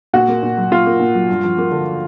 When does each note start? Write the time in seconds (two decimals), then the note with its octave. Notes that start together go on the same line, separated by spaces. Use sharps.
0.13 A#2 F#4
0.28 A#3
0.43 A#2
0.57 F#3
0.71 A#2 F4
0.86 A#3
0.99 A#2
1.14 F#3
1.29 G2
1.44 F3
1.58 A#3
1.72 D3